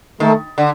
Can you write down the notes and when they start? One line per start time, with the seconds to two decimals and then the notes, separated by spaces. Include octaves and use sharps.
0.20 D#3 A3
0.58 D3